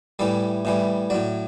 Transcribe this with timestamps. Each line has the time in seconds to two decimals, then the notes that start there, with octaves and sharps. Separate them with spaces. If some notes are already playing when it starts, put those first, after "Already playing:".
0.19 A2 E3 G3 A4
0.65 A2 E3 G3
1.10 A2 F#3 D5